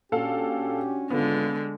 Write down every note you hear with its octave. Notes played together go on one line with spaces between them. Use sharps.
A#2 C#4 D4 F#4 G4 A4 F5
G#1 D3 G#3 B3 F4